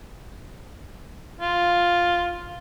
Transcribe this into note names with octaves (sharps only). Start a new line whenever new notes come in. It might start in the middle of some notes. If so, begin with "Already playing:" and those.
F4